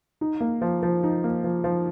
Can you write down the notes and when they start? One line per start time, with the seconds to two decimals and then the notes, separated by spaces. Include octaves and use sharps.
0.21 D#4
0.41 A#3
0.62 F3
0.83 F3
1.03 D#4
1.24 A#3
1.44 F3
1.64 F3